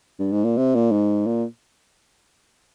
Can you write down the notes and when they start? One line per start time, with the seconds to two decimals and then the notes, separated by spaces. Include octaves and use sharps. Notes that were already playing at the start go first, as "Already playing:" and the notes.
0.19 G2
0.32 G#2
0.44 A#2
0.57 C3
0.75 A#2
0.91 G#2
1.26 A#2